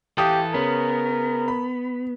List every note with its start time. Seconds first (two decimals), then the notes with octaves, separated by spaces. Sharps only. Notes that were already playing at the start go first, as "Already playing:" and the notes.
0.18 E3 G4 A4 F5 D#6 G6
0.54 C#3 B3 C#4 A#4
1.48 B5